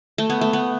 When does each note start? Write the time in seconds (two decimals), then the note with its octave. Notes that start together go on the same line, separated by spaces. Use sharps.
0.18 A3
0.30 B3
0.41 A3
0.53 B3